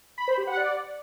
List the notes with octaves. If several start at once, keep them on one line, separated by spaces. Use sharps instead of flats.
B5
C5
G4
F#5
D5